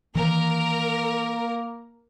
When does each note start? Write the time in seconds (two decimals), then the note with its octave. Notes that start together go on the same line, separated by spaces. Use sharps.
0.15 D#3 E3 A#3 A#4